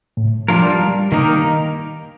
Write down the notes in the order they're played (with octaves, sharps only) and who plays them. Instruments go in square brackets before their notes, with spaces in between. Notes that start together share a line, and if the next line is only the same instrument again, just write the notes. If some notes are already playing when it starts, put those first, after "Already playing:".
[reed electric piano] A2
[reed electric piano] F3 [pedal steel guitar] G3 D4 F4 A#4
[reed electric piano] G3
[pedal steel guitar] D#3 A#3 D#4 G4 A#4